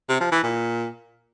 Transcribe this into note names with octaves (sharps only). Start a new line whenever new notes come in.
C3
F3
E3
A#2